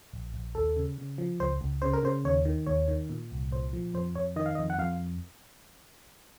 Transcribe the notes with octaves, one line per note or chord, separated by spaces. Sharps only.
A#1
A#1
D#2 A4
C#3
C#3
F3
C#2 C5
C#2
C#3 C5
A#4
C#3 C5
D#2 C#5
D#3
D#2 C#5
D#3
A#2
C2
A#2 C5
F3
F2 C5
F2 C#5
D#3 D#5
F5
D#5
F2
F#5
F2 F5